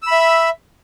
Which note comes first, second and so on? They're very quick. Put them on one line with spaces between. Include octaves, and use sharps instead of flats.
E6 B5 E5